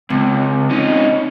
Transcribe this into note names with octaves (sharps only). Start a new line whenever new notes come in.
C#2 C4
C#4 D#4